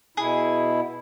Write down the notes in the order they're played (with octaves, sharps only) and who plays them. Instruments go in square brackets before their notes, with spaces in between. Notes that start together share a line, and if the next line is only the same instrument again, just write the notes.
[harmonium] B2 E4 [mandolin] G#4